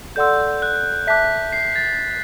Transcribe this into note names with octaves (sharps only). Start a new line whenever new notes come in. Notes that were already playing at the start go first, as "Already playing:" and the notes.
A4 D5 F#5 C6 E6 G6
F#6
E5 A5 D6 F#6 B6
C7
A6